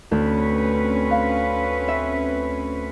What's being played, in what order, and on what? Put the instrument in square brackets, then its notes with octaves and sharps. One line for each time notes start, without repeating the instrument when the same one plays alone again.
[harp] D2 [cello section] C4 C#4 B4
[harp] F5
E5